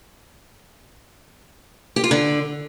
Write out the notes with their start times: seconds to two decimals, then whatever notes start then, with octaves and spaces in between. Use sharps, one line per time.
1.96 G4
2.04 F4
2.11 D3